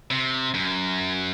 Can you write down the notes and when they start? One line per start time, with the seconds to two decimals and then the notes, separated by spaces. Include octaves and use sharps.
0.11 C3
0.54 F#2